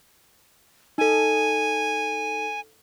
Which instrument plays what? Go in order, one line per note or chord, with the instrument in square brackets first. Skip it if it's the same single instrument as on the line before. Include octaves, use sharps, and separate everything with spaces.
[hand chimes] D#4 A4 [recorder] G#5